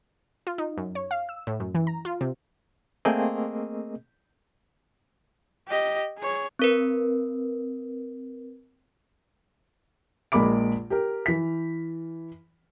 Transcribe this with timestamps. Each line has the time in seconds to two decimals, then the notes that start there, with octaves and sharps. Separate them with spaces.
0.47 F4
0.58 D#4
0.78 F#2
0.95 C#5
1.11 F5
1.29 E6
1.47 A2
1.60 F#2
1.75 E3
1.87 A#5
2.05 F4
2.21 C3
3.05 A3 A#3 C4 G#4 A#4 D#5
5.68 G4 D#5
6.18 G#4 C#5
6.59 C4 A#4 B4
10.32 A#1 G#3 A#3 B5 D6 D7
10.90 G4 A#4
11.26 E3 B6